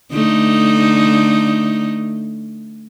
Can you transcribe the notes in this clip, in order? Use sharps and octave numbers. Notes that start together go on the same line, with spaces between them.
D3 A3 D#4